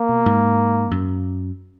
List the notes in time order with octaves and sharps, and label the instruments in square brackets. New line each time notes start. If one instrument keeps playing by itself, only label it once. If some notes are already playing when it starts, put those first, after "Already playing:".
Already playing: [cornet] A#3
[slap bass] B2
G#2
F#2